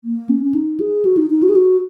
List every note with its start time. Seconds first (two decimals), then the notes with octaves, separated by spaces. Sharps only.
0.04 A#3
0.29 C#4
0.44 C#4
0.55 D#4
0.80 G#4
1.05 F#4
1.17 D#4
1.30 D#4
1.43 F#4
1.49 G#4
1.55 F#4